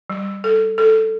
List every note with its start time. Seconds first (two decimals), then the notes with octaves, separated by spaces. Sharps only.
0.10 G3
0.44 A4
0.78 A4